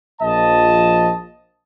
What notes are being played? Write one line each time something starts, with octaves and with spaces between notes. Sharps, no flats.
A#1 F3 D#5 A5